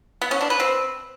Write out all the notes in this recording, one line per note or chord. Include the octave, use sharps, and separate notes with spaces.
B3
C#4
D4
B4
C4